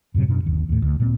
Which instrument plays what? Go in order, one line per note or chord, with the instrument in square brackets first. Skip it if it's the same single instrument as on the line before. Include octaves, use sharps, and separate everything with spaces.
[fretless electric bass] F#2 A2 C3 F#3
F#2 B2 D4
G1 D#2
D#2 A2
D2
A#2 G#3 C4